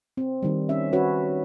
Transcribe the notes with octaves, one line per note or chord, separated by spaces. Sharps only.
C4
D#3 G3
C#4 E5
C#4 F#4 B4 C#5